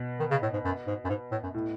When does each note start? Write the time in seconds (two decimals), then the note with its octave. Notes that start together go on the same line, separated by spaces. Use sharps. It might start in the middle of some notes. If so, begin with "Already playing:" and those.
Already playing: B2
0.19 D#3
0.31 C#3
0.42 A2
0.53 G#2
0.64 F#2
0.87 G#2
1.05 F#2
1.09 G#2
1.32 A2
1.43 F#2
1.54 A2